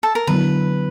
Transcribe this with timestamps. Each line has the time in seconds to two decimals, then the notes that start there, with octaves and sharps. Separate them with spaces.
0.03 A4
0.15 A#4
0.27 D3 F#3 B3 E4 B4